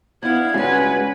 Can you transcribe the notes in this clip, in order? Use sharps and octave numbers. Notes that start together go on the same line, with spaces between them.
B3 D4 E4 F5 G#6
G2 G#3 C#4 F#4 G#4 B4 G#5